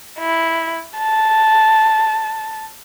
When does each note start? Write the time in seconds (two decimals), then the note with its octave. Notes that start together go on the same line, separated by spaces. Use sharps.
0.19 E4
0.98 A5